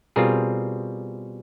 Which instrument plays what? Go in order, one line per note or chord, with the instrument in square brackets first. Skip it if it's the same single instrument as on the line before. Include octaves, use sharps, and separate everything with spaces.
[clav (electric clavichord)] B2 G3 C4 F4 G#4 A#4